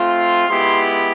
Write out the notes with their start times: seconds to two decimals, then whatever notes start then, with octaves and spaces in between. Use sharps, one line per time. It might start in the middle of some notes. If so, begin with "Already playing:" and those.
Already playing: A3 C4 F4
0.09 C6
0.48 G#3 B3 E4 G4 C6